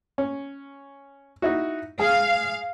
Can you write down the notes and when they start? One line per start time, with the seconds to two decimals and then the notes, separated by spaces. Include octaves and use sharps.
0.18 C#4
1.42 D#4 E4 F#4
1.99 G#4 F5